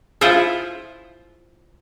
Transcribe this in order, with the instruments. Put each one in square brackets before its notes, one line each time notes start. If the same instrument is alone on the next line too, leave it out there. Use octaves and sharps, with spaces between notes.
[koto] E4 F4 C5 E5 F#5